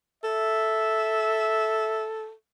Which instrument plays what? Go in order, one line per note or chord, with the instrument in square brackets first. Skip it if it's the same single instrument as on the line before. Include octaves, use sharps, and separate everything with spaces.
[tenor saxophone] A4 [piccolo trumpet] E5